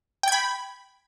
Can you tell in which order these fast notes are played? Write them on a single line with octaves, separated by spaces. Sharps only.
G5 G#6 B5